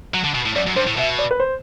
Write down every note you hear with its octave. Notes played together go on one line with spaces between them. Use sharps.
F#3
D3
B2
A2
F#2 D5
F#2
G2 C5
A2
B2 E5
D5
B4
C5